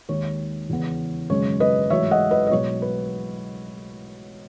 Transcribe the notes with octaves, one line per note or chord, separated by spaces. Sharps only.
D#2 D#3 G#3 D#4 C#5
E2 C#3 E3 B3
G#1 F#2 C#3 G#3 C#4 C#5
B4 D#5
A1 G#2 F#3 C#5 E5
D#5 F#5
B4 D#5
D#5
B1 B2 G#3 C#5
B4